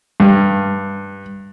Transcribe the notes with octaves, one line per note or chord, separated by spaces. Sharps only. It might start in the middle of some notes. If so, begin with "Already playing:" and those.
G2